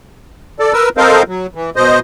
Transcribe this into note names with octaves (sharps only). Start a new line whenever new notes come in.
A4 D5
A#4 B4 E6
C4 A4 A#4 C5 D#5 F5
F#3
E3
B2 C5 D#5